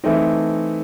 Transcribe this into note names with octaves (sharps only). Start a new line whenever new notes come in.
E3 A3 C4 D#4